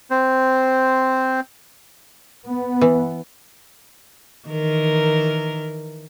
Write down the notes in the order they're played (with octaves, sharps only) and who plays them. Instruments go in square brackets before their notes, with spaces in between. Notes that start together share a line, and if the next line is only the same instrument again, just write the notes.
[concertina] C4 C5
[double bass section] B3
[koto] E3
[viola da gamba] D#3 E3 A#4